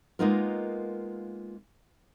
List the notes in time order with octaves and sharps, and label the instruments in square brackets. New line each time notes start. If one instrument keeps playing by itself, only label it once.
[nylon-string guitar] G#3 A#3 B3 D#4 F4 A#4